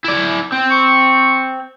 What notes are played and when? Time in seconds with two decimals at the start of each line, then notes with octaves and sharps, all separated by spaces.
0.04 E4 D5
0.52 C4
0.70 C#6